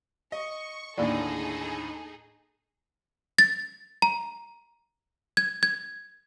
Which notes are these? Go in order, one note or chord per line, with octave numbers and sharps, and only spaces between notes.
D#5 C#6
D#2 A2 D3 A#3 D#4 G#4 A4 D5
A6
A#5
G#6
G#6